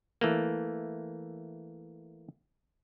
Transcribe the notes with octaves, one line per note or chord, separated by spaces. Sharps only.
E3 A3 A#3